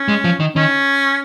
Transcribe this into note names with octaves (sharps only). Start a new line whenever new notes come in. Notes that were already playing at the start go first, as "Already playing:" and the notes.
Already playing: C#4
G#3
F3
D#3
D#3 C#4